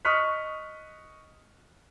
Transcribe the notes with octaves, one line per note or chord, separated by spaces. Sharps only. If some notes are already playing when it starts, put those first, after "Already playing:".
D#5 C#6 D#6 F6 F#6 B6